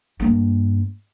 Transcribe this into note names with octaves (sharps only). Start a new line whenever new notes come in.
G2 A#3